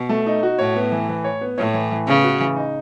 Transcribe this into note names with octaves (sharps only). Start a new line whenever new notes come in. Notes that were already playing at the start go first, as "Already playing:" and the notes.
Already playing: B2
A3
D#4
F#4
A2 C#5
B3
E3
E3
C#5
B3
A2 C#5
E3
E3
C#3 B3
F#4
E3
D#4